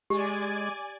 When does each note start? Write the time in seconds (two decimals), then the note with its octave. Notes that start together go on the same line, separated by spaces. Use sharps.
0.10 G#3 G4 D5 G#5